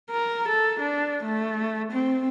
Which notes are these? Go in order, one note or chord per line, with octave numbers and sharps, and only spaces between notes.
A#4
A4
D4
A3
C4